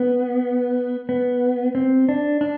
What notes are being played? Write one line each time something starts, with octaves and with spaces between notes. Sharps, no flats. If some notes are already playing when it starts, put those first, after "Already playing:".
Already playing: B3
B3
C4
D4
D4